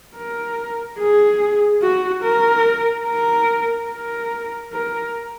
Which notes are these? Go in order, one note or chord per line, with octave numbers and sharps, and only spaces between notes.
A#4
G#4
F#4
A#4
A#4
A#4
A#4